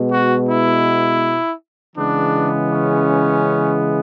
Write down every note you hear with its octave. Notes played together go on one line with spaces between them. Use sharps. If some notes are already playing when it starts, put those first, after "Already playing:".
Already playing: B2 G#3 B3
F#4
E4
C#3 E3 G#3 B3 D4
C#4